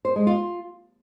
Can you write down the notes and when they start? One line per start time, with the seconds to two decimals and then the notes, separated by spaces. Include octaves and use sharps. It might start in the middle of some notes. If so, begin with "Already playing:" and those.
0.05 C5
0.16 G#3
0.27 F4